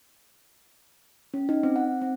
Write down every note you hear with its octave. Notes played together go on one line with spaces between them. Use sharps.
C#4
D#4
C4
F#5
C4